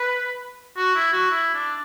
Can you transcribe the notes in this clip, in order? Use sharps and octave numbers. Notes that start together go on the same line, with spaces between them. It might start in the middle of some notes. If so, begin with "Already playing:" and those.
Already playing: B4
F#4
E4
F#4
E4
D4